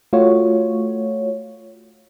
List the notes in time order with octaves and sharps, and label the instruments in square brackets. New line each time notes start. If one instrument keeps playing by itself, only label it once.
[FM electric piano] A3 F4 F#4 C#5